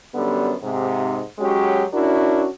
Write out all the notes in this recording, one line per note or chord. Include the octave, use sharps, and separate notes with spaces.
F#2 D3 G3 B3
G#2 C3
F#3 G#3 C#4 F#4 G4
C#4 D4 E4 F#4 A#4